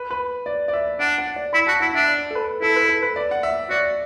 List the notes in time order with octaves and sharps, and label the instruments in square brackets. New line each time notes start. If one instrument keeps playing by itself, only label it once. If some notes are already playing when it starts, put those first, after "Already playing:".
Already playing: [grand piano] B4
B4
D5
D5
E5
[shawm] D4 [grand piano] F#5
[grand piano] F#5
D5
[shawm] E4 [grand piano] B5
[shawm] F#4 [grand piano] A5
[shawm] E4 [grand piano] F#5
[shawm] D4 [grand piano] E5
[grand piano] D5
A4
B4
[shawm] E4 [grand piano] A4
[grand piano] B4
A4
B4
D5
F#5
E5
[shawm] F#4 [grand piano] D5